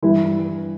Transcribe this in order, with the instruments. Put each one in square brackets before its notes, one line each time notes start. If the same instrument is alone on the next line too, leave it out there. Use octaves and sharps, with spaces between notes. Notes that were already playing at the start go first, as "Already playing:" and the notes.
[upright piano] G2 E3 G3 [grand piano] E4